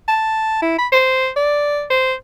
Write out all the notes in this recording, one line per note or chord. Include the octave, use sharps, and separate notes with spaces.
A5
E4
B5
C5
D5
C5